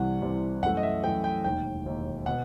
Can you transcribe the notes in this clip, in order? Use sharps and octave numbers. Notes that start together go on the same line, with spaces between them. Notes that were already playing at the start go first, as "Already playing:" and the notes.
Already playing: C2 C3 E3 G3 F#5
C2 C3 E3 G3
F#2 E3 A3 F#5
D#5
E5
F#2 E3 A3 G5
G5
E1 D#2 D#3 G5
E1 D#2 D#3
B2 F#5